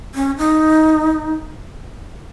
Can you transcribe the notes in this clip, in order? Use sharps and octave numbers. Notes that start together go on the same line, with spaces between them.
C#4
D#4